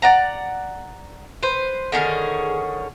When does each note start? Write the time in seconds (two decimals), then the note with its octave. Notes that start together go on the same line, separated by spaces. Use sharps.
0.02 D5 F#5 A#5
1.43 B4 C5
1.92 D3 D#3 C#4 G#4